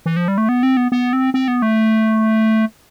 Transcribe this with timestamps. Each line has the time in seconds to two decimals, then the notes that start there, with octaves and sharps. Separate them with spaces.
0.06 E3
0.16 F3
0.28 G3
0.38 A3
0.49 B3
0.63 C4
0.77 B3
0.92 B3
1.13 C4
1.34 C4
1.48 B3
1.62 A3